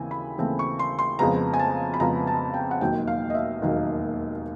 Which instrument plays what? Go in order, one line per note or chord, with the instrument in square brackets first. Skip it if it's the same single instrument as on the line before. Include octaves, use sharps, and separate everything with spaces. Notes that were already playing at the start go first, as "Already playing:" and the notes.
Already playing: [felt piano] D#2 C#3 E3 C4 G#5
B5
D#2 C#3 E3 A3 C4
C#6
C6
C6
F2 C#3 F3 G#3 B3 A#5
G#5
A5
B5
F2 C#3 F3 G#3 B3 A#5
A5
G5
F#5
E1 D#2 D#3 F#3 A#3 G5
F5
D#5
E5
E1 D#2 D#3 F#3 A#3